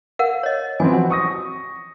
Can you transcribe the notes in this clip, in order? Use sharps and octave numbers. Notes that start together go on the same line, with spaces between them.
A#4 F5 F#5
C#5 D#5
E3 F3 C4 G#5
F#4
C#6 D#6 A#6